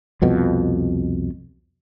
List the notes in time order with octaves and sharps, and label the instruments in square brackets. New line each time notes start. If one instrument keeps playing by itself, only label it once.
[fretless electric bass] C2 F2 B2